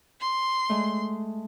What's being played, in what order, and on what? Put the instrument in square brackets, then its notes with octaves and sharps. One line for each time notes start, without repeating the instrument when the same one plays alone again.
[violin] C6
[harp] G#3 A3